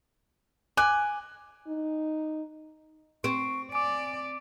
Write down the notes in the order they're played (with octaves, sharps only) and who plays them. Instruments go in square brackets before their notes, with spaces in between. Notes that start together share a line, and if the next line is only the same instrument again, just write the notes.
[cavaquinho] G#5 [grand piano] D6 F#6
[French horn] D#4
[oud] C4 [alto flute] C#6 [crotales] D7
[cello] D5 [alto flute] G#5 [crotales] D6 D7